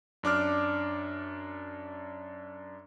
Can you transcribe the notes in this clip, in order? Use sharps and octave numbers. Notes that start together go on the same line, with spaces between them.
F#2 D4 D6 F6